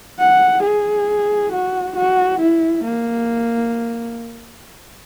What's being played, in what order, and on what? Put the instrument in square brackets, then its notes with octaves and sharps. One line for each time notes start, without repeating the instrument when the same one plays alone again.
[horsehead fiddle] F#5
G#4
F#4
F#4
E4
A#3